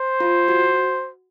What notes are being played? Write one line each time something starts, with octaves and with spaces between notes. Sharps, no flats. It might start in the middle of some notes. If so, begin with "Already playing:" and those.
Already playing: C5
F4
F#4